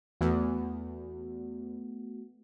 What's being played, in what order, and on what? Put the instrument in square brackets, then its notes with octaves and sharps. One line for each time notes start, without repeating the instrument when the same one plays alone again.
[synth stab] E2 [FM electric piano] A3 B3 F#4